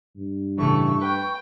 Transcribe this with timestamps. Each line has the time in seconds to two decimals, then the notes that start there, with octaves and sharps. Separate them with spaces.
0.16 G2
0.58 A2 C#3 E3 A3 C#6
1.01 B4 G5